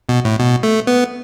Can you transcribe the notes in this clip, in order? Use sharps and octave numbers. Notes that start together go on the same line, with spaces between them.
B2
A2
B2
A3
B3